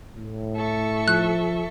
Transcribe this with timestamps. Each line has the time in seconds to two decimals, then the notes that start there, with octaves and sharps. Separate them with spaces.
0.16 A2
0.56 A4 E5 C#6
1.08 F3 F#6